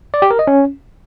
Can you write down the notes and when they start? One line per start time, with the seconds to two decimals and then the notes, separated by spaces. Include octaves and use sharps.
0.14 D5
0.22 G4
0.31 A#4
0.39 D#5
0.47 C#4